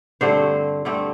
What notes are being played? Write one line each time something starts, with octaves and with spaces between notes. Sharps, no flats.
G2 D3 A3 C4 C5
G2 D3 A3 C4